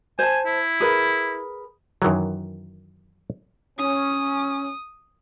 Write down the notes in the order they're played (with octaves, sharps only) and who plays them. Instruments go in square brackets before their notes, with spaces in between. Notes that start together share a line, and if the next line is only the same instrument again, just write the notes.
[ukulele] C5 A5 [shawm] G#5
[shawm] E4
[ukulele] G#4 A#4 B4
[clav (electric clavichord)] F#2 D#3 E3 F#3
[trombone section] C#4 [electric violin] D#6